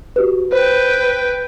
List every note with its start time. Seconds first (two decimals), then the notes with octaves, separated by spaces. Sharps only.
0.16 F#4 G4 B4
0.53 B4 C5 G5